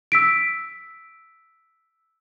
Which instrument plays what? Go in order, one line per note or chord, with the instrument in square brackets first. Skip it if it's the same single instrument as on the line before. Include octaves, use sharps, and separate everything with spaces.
[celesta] E6 B6 D7